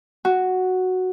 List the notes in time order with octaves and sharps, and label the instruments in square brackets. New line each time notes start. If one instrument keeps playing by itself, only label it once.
[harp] F#4